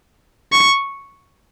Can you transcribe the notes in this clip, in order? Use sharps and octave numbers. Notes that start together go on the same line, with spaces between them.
C#6